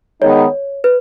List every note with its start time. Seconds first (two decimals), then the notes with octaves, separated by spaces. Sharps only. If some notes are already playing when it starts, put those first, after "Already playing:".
0.21 D#3 G#3 B3 D#4 C#5
0.84 B4